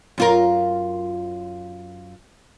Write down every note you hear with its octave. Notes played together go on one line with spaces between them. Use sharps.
F#2 F4 A#4